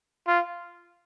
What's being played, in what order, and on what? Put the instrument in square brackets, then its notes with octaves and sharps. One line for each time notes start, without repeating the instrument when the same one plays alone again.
[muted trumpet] F4